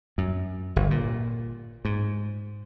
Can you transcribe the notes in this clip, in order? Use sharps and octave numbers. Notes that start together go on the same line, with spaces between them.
F#2
G1
A#2
G#2